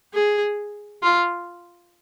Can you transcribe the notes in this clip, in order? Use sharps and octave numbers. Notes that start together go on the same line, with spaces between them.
G#4
F4